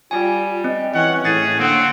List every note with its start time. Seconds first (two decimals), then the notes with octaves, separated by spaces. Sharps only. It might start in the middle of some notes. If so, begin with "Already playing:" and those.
0.11 G3 F4 G#5
0.64 C4 D#5
0.94 E3 C#4 F#5
1.25 A2 G#4 A6
1.60 D3 A#3 C4 F#5